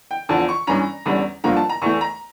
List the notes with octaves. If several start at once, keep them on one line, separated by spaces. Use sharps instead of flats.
G5
E2 D3 F3 A5
C#6
G2 E3 G3 C#4 A#5
E2 D3 G3 C#4
G2 D3 F3 A#3 A#5
A5
A#5
E2 E3 A3 C#6
A#5